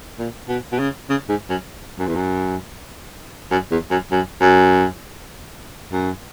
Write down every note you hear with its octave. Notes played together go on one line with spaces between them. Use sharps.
A#2
B2
B2
C#3
C#3
G#2
F#2
F#2
E2
F#2
F#2
E2
F#2
F#2
F#2
F#2